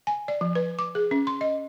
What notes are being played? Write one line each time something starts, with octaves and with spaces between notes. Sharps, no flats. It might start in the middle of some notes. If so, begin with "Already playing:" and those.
G#5
D5
F3
B4
D6
G#4
C#4
C6
D#5